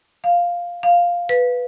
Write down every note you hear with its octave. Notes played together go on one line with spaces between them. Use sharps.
F5
F5
B4